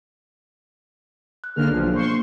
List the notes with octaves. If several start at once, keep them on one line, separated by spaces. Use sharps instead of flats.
F#6
D3 A#3 D4 G#4 F6
B1 F3
A#3 C5 C6 C#6